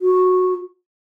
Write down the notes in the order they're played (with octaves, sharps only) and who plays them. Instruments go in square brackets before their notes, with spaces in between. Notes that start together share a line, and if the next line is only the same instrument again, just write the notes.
[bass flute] F#4